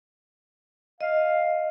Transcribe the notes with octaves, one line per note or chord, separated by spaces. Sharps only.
D#5 F5